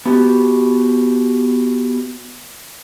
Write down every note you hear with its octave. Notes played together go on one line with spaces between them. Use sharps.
B3 F#4 G4